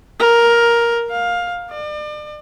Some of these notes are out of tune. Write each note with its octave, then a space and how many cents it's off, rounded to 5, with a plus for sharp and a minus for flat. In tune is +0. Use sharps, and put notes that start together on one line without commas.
A#4 +10
F5 +15
D5 +40